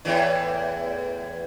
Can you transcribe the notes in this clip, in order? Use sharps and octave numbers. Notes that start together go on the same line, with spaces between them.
E2 A2 E3